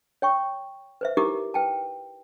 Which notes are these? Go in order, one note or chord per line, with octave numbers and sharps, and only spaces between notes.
C#5 G5 C#6
B4 C5 E5
D#4 E4 G4 A#4 D6
B4 G5 A5